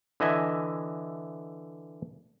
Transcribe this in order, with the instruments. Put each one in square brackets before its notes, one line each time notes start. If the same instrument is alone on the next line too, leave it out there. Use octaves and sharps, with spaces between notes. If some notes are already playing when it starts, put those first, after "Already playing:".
[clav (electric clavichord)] D3 E3 D#5 E5 G#5